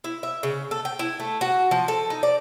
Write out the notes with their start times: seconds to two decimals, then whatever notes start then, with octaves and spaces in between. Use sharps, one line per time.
0.04 E4
0.23 E5
0.43 C#3
0.71 A4
0.85 G5
0.99 E4
1.20 A3
1.41 F#4
1.71 F3
1.88 A4
2.10 D#4
2.23 D5